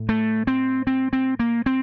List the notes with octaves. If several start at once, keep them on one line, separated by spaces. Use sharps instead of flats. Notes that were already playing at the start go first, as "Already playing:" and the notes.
Already playing: A2
A3
C4
C4
C4
A#3
C4